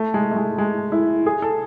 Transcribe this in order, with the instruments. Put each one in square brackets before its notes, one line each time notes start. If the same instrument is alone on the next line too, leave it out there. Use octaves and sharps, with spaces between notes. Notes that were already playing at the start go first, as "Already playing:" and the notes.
Already playing: [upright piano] A3
G#3
A3
G#3
G#3
E4
G#4
A4